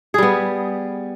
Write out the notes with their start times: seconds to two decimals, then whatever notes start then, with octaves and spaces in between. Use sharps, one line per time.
0.14 G#4
0.18 G3
0.23 B3